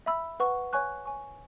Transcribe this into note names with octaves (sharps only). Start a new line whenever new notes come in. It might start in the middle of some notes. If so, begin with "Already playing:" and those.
E5 B5 E6
B4 F#5 C#6
C#5 G#5 C#6 F#6
C#5 G#5 C#6